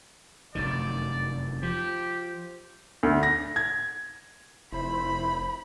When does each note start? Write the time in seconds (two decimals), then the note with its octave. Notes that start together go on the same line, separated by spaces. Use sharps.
0.55 F1 F#2 D#3 D5
1.63 F3 G4
3.03 D2
3.23 A#6
3.56 G#6
4.72 F1 E4 C5 B5